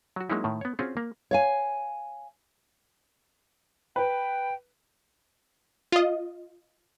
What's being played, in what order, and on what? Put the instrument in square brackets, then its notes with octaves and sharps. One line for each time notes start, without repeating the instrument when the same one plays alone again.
[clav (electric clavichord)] F#3 F#4
F#3 G#3 A#3 C#4 D#4 E4
A2 D#3
B3 C#5
C4 C#4 F4 F#4 G#4
A#3
[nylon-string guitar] C#5 F5 G#5
[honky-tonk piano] B4 [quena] G5
[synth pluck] F4 D#5